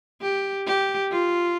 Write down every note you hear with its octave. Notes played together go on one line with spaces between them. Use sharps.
G4
G4
F4